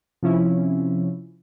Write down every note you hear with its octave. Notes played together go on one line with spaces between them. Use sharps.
C3 F3 C#4 E4